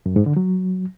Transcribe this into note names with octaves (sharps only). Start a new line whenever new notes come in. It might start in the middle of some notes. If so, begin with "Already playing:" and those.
F#2
G#2
D3
F#3